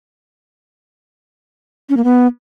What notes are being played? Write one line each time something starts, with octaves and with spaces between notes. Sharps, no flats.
C#4
A#3
B3